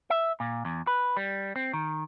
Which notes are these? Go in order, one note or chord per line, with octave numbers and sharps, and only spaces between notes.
E5
A#2
E2
B4
G3
C4
D#3